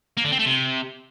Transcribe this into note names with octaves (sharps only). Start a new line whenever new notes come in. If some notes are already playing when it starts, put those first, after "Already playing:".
A#3
D3
C4
A3
C3